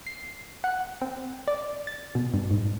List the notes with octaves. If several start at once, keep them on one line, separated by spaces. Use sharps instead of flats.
C7
F#5
C4
D5
A6
B2
G2
G#2